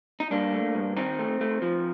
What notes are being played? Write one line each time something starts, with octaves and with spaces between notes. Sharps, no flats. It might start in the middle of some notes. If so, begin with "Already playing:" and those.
D#4
G2 A#3 D4
A3
G2
D#3 C4 D#4
A3
A3
F3